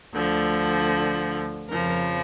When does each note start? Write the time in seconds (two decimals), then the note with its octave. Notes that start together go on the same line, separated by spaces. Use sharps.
0.15 D2 D3 F3
1.69 F2 C#3 F3 A#4